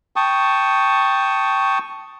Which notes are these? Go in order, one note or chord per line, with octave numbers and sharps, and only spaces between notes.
G5 A5 C#6 D#6